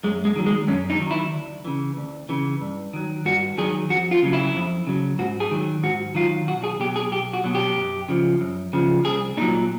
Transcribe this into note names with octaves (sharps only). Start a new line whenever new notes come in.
F#2 G#3
G#3
D#3 F#3
G#3
F#2 C#4
D#4
D#3 F#3
E4
D2
C#3 E3
D2
C#3 E3
G2
D#3 F#3
G2 F#4
D#3 F#3 G#4
F2 F#4
F4
C#3 F#3
E4
F2
C#3 F#3
G#2 F#4
G#4
D#3 F#3
G#2 F#4
D#3 F#3 F4
B1 F#4
G#4
B2 F#3 G4
G#4
B1 G4
F#4
B2 F#3
G4
F#2
C#3 F3
F#2
C#3 F3
C2 G#4
A#2 F#3 D#4